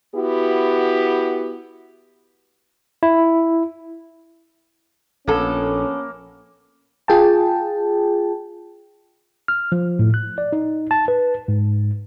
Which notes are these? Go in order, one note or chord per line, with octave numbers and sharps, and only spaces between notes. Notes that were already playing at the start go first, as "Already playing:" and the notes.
B3 E4 F#4 G4
E4
A#1 A#3 B3 C#4 A4
F4 G#4 G5 A5
F6
F3
A2
F#6
D5
D#4
A5
B4
G#2